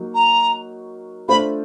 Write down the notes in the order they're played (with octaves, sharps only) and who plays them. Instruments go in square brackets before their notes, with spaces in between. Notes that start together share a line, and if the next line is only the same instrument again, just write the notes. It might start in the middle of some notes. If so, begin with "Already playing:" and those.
Already playing: [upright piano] F#3 A#3 D#4 F#4
[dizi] A#5
[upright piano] A3 D4 F4 A4 C5 [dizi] B5